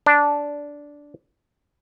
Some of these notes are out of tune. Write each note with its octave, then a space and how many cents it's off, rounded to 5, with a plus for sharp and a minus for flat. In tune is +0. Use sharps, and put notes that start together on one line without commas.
D4 -10